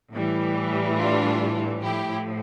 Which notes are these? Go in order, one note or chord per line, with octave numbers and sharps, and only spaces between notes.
A2 E3 G3
D4 F4
A2 F3 E4 G4